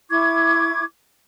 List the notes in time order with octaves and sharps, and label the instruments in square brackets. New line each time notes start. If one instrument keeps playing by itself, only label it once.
[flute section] E4 C#6 D6 G#6